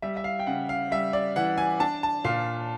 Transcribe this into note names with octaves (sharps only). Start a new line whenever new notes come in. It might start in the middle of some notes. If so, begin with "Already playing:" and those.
G3 E5
E5
F5
G5
C#3 F#5
F5
G3 E5
D5
E3 F#5
G#5
D4 A5
A5
A#2 F5